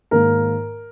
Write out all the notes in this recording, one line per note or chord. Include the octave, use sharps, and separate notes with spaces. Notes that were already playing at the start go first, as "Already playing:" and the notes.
G#2 D#3 A#3 A#4